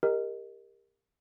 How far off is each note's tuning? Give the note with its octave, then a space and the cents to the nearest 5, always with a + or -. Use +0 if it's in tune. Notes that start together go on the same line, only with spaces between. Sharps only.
G4 +30 A#4 +0 D#5 +0